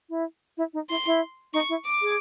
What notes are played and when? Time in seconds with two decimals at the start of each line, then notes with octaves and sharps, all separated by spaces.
0.10 E4
0.57 E4
0.74 D#4
0.90 E4 C6
1.06 E4
1.53 D#4 C#6
1.69 E4
1.85 D6
2.02 G#4